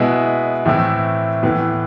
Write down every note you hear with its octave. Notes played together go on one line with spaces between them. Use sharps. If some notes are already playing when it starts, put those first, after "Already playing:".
Already playing: B2 G#3 B3 E4
A2 E3 A3 C4 E4
A2 E3 B3 E4